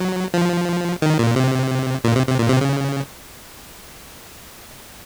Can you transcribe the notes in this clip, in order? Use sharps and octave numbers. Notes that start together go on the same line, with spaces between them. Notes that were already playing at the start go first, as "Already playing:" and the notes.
Already playing: F#3
F3
D#3
A#2
C3
A#2
C3
C3
A#2
C3
C#3